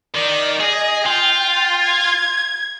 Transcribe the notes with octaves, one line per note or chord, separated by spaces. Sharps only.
D#3 D5
G#4 D#5
F4 G5
G#6